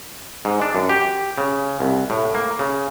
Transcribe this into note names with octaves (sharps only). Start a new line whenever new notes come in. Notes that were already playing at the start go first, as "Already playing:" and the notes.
G#2
D4
F#2
G4
C#3
C2
A2
A#3
C#3